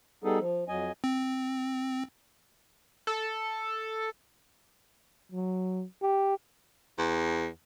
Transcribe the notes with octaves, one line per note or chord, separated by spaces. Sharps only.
G3 B3 D#4 G#4 A4
F3
F2 F#3 D#5 G#5
C4
A4
F#3
G4
E2